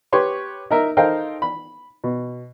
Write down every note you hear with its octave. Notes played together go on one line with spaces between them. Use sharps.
G4 B4 C#5 C6
D#4 A#4 E5
D#4 A4 A#4 C5 F5 G5
B5
B2